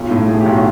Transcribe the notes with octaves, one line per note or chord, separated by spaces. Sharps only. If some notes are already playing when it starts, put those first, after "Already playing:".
Already playing: B1 F4
A2
A2 G#4
G4
B1
F#4